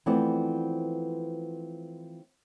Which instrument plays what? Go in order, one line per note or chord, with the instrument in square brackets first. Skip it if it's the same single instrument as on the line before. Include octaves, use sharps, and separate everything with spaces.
[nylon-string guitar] E3 F3 A3 B3 C4 D5